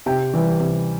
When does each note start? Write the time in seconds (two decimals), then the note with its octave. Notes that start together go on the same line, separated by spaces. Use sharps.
0.06 C3 G5
0.33 E3 G3
0.60 C3